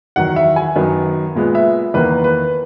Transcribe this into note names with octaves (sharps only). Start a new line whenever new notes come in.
E2 D#3 F#3 F#5
E5
G#5
F#2 D#3 F#3 B3
A#2 G#3 B3
E5
E2 D#3 A#3 B4
B4